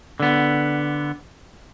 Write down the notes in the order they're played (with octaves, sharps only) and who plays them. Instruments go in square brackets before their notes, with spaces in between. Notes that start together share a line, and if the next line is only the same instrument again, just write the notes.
[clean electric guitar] D3 B3